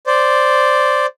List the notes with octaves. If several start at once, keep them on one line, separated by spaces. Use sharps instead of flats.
C5 D5